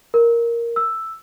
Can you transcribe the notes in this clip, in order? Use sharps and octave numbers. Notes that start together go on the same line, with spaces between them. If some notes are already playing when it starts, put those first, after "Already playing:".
A#4
E6